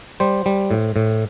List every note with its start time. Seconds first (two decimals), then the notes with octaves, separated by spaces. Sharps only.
0.20 G3 C5
0.46 G3
0.71 A2
0.96 A2